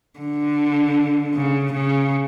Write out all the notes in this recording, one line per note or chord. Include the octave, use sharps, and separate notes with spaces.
D3
C#3
C#3